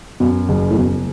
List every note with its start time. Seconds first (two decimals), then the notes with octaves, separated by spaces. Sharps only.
0.20 F#2 B2
0.49 F#1
0.71 A2
0.78 F#1 B2